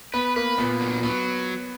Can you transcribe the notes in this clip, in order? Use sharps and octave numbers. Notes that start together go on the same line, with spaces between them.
B3 B4
A#3 B4
A#2 B3
F#3
F#3 B3